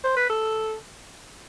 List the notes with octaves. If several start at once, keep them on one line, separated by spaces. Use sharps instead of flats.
C5
B4
A4